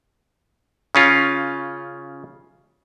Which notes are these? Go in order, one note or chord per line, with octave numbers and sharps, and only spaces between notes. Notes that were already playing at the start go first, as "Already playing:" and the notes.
C#3 C#4 F4